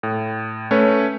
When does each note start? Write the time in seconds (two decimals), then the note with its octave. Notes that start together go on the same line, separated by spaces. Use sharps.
0.03 A2
0.71 A3 C#4 B4 C#5